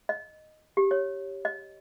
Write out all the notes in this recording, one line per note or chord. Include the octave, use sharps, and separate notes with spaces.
D#5
G4
C#5
D#5